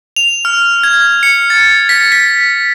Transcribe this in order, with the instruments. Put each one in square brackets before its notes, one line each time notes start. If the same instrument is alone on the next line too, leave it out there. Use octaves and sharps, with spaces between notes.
[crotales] F7
F6
G#6
C#7
A6
B6
B6